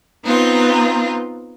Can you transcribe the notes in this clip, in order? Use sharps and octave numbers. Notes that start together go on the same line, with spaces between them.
B3 C4 D#4 F4